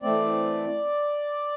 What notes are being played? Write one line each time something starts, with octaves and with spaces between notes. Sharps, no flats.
E3 A3 C4 D5